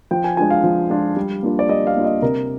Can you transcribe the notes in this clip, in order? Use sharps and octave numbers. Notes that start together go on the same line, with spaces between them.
F3 G5
G#5
G#3 D4 F4 G#5
F5
F3
G#3 D4 F4
G3
A#3 D4 F4
D5
G3 D#5
F5
A#3 D4 F4
D#5
C3 A#4